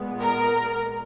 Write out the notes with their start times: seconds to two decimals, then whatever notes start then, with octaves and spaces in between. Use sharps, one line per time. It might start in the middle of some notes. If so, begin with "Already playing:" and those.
Already playing: A#2 G#3 B3
0.19 A#4